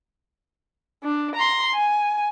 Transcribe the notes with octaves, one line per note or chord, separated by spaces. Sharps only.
D4
A#5 C6
G#5